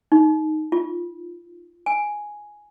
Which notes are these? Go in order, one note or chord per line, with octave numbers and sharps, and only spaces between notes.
D#4
F4
G#5